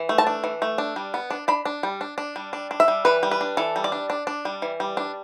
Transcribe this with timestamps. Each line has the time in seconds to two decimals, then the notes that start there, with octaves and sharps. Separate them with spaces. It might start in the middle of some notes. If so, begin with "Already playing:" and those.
Already playing: E3
0.09 A3
0.18 A5
0.27 D4
0.44 E3
0.62 A3
0.78 D4
0.96 G3
1.14 B3
1.30 D4
1.48 D4 B5
1.65 D4
1.83 G3
2.01 D4
2.18 D4
2.36 G3
2.53 D4
2.71 D4
2.80 E5
2.88 G3
3.05 E3 B4
3.23 G3
3.31 B4
3.41 D4
3.57 E3 A4
3.76 G3
3.84 D5
3.92 D4
4.10 D4
4.27 D4
4.45 G3
4.62 E3
4.80 G3
4.97 D4